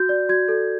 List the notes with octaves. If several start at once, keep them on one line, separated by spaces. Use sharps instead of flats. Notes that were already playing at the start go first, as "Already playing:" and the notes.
Already playing: F#4 G6
D5
F#4 G#6
A4